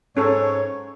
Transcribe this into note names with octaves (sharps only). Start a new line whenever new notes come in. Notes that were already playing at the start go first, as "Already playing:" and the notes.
G#2 C#4 A4 C#5